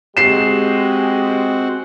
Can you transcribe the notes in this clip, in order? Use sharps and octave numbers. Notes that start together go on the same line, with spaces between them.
G#3 C4 F#4 G4 C7 E7